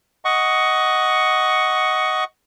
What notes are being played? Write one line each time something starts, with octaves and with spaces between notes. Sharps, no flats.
D#5 F#5 C#6